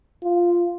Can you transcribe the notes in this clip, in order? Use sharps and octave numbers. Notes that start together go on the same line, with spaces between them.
F4